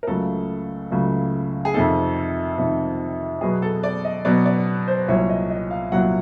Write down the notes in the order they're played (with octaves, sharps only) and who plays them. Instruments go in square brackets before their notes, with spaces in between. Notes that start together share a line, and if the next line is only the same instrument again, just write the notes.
[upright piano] A#4
C#2 C#3 F#3 A3 A4
C#2 C#3 F#3 A3
G#4
F2 C3 D#3 A4
F2 C3 D#3
B2 F#3 B3 G#4
A4
D5
D#5
B2 F#3 B3 D5
D5
C5
C2 A#2 F#3 C#5
D#5
D#5
F5
C2 A#2 F#3 F#5